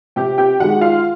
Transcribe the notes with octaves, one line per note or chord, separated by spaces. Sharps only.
C3 G4 G5
G4 G5
D#3 G#3 F#4 F#5
F4 F5